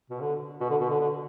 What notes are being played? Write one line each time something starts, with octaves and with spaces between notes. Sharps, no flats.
B2
D3
B2
D3
B2
D3
D3